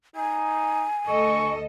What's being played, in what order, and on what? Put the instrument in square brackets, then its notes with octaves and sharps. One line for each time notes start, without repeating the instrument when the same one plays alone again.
[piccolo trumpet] D#4 [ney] G#5
[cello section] D2 A4 D#5 [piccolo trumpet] C#6